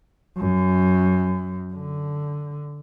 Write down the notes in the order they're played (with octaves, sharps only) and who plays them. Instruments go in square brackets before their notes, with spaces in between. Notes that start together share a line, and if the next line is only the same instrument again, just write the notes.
[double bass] F#2
D3